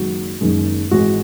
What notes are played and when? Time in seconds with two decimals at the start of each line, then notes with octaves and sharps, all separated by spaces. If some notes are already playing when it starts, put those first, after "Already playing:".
Already playing: F#1 F#2 D#3 G#3 F#4
0.41 F#1 F#2 D#3 G#3
0.91 G#1 G#2 E3 G#3 F#4